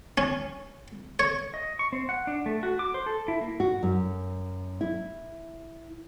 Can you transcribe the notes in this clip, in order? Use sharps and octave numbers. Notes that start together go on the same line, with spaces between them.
C#4
C#5
D#5
C#6
C4
F#5
D4
A3
F#4
D6
C5
A4
E4
A#3
F#4
F#2
E4